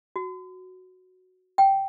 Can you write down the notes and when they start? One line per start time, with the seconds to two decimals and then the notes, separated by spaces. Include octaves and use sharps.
0.16 F#4
1.58 G5